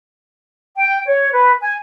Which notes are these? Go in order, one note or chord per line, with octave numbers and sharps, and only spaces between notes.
G5
C#5
B4
G#5